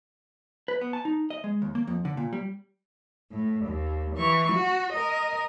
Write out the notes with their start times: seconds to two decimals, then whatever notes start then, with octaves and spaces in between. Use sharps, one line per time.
0.68 B4
0.81 B3
0.93 A5
1.05 D#4
1.30 D#5
1.44 G#3
1.62 D#2
1.75 A#3
1.87 F2
2.05 D3
2.17 A#2
2.33 G3
3.30 A2
3.65 D#2
4.16 E3 C#6
4.52 F#4
4.93 A#4 D#5